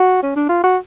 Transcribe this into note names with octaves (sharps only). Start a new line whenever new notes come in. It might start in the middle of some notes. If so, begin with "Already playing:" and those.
Already playing: F#4
C#4
D4
F4
F#4